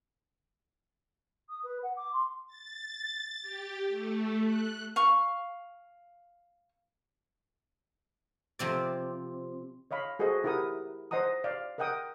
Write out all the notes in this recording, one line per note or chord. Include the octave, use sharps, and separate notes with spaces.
D#6
B4
F#5
D6
C6
A6
G4
A3
F#6
F5 C#6
C3 F3 C4 D5
C#5 D#5 F5 B5
F#4 G#4 A4 C5 D#5
E4 G4 A#4 F#5 D#6
C5 D#5 F#5 A#5 D#6
D5 F5
A#4 D#5 F#5 G5 D#6